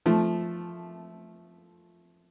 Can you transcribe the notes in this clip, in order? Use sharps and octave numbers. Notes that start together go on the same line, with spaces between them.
F3 A3